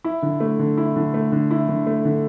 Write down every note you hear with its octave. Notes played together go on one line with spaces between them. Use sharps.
E4
D3
A3
D3
E4
D3
A3
D3
E4
D3
A3
D3